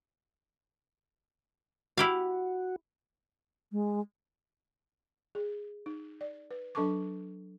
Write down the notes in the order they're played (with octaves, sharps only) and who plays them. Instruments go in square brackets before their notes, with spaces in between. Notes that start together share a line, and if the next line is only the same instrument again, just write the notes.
[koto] E4 G4 F5 [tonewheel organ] F#4
[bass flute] G#3
[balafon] G#4
D#4
D5
B4
F#3 D4 A4 A5 C#6 D6